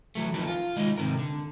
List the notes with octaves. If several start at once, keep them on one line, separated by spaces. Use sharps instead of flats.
E3 F#3 A3
D2 F3 B3 D#4 A4 A#4
F4
D#2 G#3 D#4 D#5
G#2 C3 D#3 A#4
D3